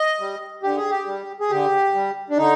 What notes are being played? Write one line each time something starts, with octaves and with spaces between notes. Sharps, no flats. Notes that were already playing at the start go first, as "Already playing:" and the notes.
Already playing: D#5
G3
D3 G4
G#4
G4
G3
G#4
D3 G4
G3
D4
D3 D#4